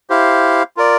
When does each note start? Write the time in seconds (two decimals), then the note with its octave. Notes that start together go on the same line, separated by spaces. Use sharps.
0.10 E4 G4 C5 F5
0.77 F4 A#4 D5